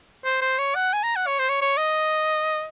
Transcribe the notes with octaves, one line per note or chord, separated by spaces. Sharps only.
C5
C5
C#5
F#5
G#5
A#5
F#5
C#5
C5
C#5
C#5
D#5